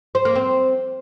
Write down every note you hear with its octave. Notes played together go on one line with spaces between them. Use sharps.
C5
A#3
C4